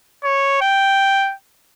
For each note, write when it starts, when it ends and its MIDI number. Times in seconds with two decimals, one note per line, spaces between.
0.24 0.60 73
0.61 1.34 79